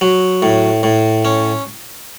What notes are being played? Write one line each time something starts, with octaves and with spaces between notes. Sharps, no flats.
F#3
A2
A2
C#4